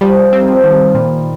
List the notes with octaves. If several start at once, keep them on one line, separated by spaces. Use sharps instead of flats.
F3 G3
C4
D#3
F3
D#3
A#2 G3